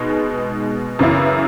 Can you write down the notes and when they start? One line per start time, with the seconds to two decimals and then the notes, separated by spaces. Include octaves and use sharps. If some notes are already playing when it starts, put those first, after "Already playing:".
Already playing: B2 G#3 B3 D#4
0.99 F#2 C#3 E3 B3 E4